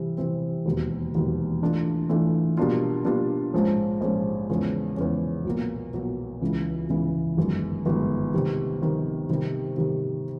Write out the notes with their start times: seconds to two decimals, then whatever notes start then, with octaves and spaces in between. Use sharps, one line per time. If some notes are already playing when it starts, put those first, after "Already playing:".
Already playing: C3 E3 G3 C4
0.17 C3 E3 G3 C4
0.65 E1 D#2 D#3 F#3
1.14 E1 D#2 D#3 F#3
1.62 E3 A3 D4 F4
2.09 E3 A3 D4 F4
2.57 B2 G3 A#3 D4 F4
3.05 B2 G3 A#3 D4 F4
3.54 A#1 G#2 F3 G#3 C#4
4.01 A#1 G#2 F3 G#3 C#4
4.49 E2 C#3 F3 G#3 C#4
4.97 E2 C#3 F3 G#3 C#4
5.45 B1 A#2 F#3 A#3
5.93 B1 A#2 F#3 A#3
6.41 C#2 C#3 E3
6.89 C#2 C#3 E3
7.37 G1 F#2 D#3 G#3
7.86 G1 F#2 D#3 G#3
8.34 C3 D#3 G3
8.82 C3 D#3 G3
9.29 C3 D#3 G3
9.77 C3 D#3 G3